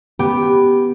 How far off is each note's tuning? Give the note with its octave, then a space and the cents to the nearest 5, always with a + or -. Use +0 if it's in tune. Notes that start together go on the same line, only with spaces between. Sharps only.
B3 +0 G4 +0